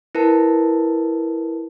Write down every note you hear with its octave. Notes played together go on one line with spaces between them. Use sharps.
E4 A#4 B4 A5